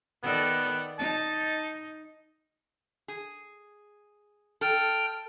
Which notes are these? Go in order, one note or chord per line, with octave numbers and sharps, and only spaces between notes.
D#3 B3 A4 D5
D#4 A5
G#4
A4 G5 F6